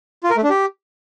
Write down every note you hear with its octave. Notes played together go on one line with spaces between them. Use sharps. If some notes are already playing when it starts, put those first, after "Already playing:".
F4
A#4
A3
D4
G4